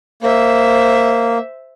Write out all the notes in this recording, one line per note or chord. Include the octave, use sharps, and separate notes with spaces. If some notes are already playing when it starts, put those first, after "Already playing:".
A#3 C5 E5